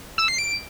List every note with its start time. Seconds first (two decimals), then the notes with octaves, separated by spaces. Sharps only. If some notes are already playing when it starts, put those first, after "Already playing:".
0.18 E6
0.28 C7
0.38 D7